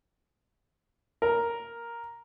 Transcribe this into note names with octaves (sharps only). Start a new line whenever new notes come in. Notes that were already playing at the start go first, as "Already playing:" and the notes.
A#4